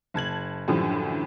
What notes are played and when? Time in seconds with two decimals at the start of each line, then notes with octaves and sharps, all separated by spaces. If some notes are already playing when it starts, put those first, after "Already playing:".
0.14 F#1 A5 G#6 F#7
0.68 F#2 A2 D3 E3 F3 G3